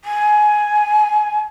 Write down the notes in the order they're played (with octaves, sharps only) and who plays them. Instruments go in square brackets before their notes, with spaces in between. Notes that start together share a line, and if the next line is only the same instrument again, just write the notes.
[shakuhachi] G#5